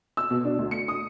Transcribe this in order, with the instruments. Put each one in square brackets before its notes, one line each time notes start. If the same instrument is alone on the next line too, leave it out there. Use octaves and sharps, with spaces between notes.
[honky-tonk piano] E6
B2
D4
D2
C#7
D#6